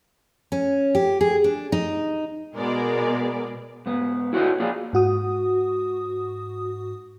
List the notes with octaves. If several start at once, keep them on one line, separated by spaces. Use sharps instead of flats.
C#4
G4
G#4
D4
D#4
B2 G#3 B3 G#4 A#4 D5
G#2 B3
E4 F#4 A#4 C#5 D#5
A#3 F4 G#4 D5
G#2 F#4 D#6